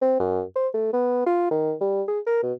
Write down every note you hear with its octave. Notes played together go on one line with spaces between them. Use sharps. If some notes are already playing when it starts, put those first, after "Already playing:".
C4
F#2
C5
A3
B3
F4
D#3
G3
G#4
A#4
B2